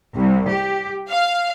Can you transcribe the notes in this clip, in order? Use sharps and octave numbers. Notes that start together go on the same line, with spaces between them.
C2
G4
F5